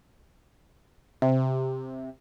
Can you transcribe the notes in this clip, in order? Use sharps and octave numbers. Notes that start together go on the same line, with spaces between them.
C3